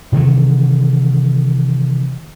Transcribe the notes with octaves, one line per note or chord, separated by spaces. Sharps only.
C3 D#3 E3 A3